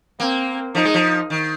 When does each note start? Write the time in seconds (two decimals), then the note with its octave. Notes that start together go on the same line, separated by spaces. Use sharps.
0.20 A#3 C4
0.75 F3 D#4
0.85 G#3
0.94 F3
1.30 D#3